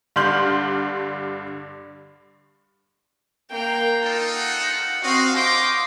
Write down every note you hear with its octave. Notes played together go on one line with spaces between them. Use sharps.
G2 D3 C6 F6 G6 F#7
A#3 G5
D#4 F4 A4
F#5
C4 F#4 D#5 F5
D#5 F5 G5 C6 D6